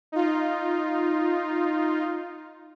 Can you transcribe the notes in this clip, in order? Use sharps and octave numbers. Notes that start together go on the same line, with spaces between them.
D#4 F4